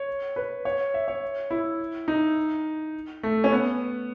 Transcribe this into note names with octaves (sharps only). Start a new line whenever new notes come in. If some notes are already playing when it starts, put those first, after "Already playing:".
Already playing: C#5
B4
C#5
E5
C#5
E4
D#4
A3
C#4
B3